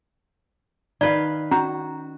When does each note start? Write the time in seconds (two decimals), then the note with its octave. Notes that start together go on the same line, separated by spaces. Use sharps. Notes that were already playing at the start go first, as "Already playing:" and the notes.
1.01 D#3 B4 D5 F5
1.51 C#4 F#4 A#5